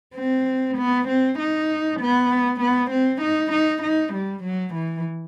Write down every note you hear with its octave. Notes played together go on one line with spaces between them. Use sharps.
C4
B3
C4
D#4
B3
B3
C4
D#4
D#4
D#4
G3
F#3
E3